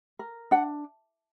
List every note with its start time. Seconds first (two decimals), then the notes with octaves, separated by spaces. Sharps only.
0.19 A#4
0.51 D4 F#5